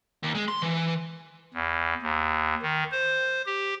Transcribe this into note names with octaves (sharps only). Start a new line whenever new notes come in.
D#2
G#3
C6
E3
E2
D#2
D#3
C5
G4